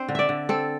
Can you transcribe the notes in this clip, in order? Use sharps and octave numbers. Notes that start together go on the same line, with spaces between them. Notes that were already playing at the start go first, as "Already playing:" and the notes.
Already playing: C4 D4 C5
D3
D5 E5
D3
C4 A4